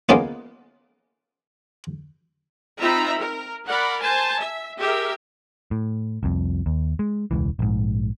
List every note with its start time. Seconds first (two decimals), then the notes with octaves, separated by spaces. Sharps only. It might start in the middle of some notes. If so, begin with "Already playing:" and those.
0.09 G#3 A#3 B3 C#4 F4
2.80 C4 D#4 F4 E5 A#5 B5
3.19 A#4
3.65 A#4 D5 F#5 B5
4.00 C5 G#5 A5
4.38 E5
4.78 G4 G#4 A#4 E5
5.71 A2
6.23 C2 F2
6.66 D#2
6.99 G#3
7.31 E1 C#2 E3
7.59 A#1 G#2